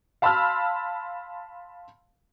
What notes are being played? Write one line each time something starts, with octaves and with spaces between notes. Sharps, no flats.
F5 A5 B5 C6 E6 F6